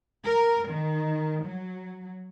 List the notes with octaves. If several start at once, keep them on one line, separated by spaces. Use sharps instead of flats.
A#4
D#3
F#3